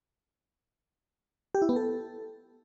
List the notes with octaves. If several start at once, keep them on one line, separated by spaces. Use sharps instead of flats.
G4
E4
B3
A4